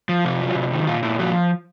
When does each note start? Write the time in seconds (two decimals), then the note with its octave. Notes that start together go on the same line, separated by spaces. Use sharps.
0.09 F3
0.25 C3 F4
0.41 F#3
0.56 C3
0.72 D#3
0.87 A#2 F4
1.03 A#2 E4
1.19 F3 F#4